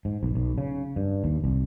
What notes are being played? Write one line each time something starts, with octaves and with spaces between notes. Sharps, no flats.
G#2
B1
B1
C#3
G2
D#2
C2